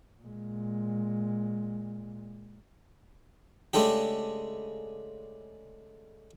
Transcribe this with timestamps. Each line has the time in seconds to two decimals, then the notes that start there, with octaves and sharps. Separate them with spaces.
0.22 A#2 G#3
3.73 C#3 G#3 A3 D4 G4